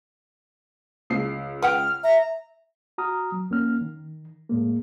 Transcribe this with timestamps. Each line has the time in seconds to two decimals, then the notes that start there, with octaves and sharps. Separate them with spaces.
1.10 C#2 C7
1.62 B4 F#5 G5 F6
2.04 E5 A#5
2.98 F#4 A#5 D#6 F6
3.32 F#3
3.50 F2 A#3 C#4 F6
3.81 D#3
4.50 F2 A2 G#3 A#3